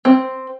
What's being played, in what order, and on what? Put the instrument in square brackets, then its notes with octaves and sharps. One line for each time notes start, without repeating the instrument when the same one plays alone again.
[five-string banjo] C4